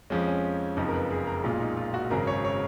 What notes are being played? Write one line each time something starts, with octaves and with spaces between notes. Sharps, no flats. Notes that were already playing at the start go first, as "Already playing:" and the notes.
F2 F3 G#3 C#4
C#4
F#1 F2 F3 D#4
A#4
B4
G#4
A#4
B1 A#2 G#3 F4
D#4
F4
F#4
G#1 F#2 C#3 G#3 A#4
C#5
C#5